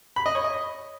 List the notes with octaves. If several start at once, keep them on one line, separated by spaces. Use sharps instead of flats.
B5
D#5
C#5
D#5